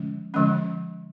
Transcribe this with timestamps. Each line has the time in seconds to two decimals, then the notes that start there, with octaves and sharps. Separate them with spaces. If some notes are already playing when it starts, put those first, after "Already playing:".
Already playing: D3 F3 G#3 C#4
0.34 D3 F3 G#3 C#4